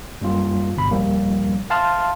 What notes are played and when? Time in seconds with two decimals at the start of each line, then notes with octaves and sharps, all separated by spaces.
0.21 F#2 G3 A#3 F4
0.77 G1 G2 B2 B5
0.91 D#2 A#2 F3 G3 A#3
1.70 E5 F5 A5 C6 F6